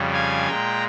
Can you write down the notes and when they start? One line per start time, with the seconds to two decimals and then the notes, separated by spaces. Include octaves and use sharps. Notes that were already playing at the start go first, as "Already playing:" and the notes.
Already playing: F2 C#3 G3
0.13 F5 G#5
0.47 A#2 G#3 G5 A#5